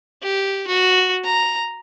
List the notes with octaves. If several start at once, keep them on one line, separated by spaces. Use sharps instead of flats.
G4
F#4
A#5